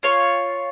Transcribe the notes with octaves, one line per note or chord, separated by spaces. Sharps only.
F4 C#5